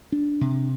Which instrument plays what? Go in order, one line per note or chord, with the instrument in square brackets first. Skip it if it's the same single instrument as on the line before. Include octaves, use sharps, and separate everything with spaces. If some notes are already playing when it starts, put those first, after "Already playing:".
[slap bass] D4
C3